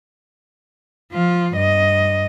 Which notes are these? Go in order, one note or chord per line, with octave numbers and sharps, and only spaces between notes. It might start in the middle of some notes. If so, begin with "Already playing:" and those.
F3 F4
G2 D#5